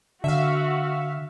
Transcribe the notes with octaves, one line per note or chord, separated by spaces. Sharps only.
D3 F#4 E5 F5